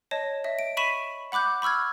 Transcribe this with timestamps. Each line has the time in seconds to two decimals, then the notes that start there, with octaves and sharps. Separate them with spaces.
0.11 C#5 D#5 A5
0.44 D#5 E5
0.59 D7
0.77 B5 C#6 B6 D#7 E7
1.32 F#5 B5 D6 F#6 G6
1.62 B5 C#6 E6 F6 G#6